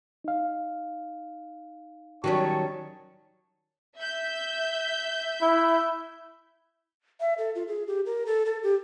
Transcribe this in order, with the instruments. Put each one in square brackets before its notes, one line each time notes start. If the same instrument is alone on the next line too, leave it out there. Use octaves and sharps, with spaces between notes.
[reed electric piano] D#4 F5
[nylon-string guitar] D#3 F#3 G3 [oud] C#4 F#4 [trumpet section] C#5 A5 C#6
[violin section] E5 G6
[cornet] E4
[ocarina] E5
A4
F4
G#4
G4
A#4
A4
A4
G4